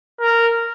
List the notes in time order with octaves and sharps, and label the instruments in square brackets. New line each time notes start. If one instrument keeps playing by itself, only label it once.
[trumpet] A#4